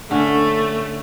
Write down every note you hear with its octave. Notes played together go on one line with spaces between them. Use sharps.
D3 A3 C#4